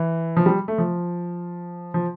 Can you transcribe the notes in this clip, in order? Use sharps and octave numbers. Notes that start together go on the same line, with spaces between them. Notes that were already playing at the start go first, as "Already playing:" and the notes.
Already playing: E3
F3
G3
A3
F3
F3